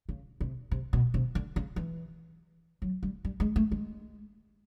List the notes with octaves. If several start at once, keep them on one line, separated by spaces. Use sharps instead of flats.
C#3
C3
C3
B2
C3
D3
C#3
E3
F#3
G3
G3
G#3
A3
G#3